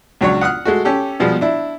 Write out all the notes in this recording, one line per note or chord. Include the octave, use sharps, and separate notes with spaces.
C#2 F#3 D4 C#5
F#5 D#6 F6 F#6
G#3 A3 F#4
C#4 G4 A4
B2 F3 G3 G#3 B3
D4 E4